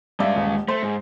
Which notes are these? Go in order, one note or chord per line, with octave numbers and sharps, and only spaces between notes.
G2 G#3 D5 E5 F5
D#1
A3 C5
G#2